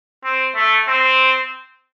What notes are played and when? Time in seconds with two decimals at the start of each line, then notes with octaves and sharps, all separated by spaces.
0.24 C4
0.55 A3
0.88 C4